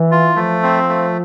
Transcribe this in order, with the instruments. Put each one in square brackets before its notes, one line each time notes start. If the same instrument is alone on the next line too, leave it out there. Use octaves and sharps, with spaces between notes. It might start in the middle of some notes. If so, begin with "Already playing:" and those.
Already playing: [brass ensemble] E3
[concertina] F4
[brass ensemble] F3 [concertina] A3
[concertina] C4
A3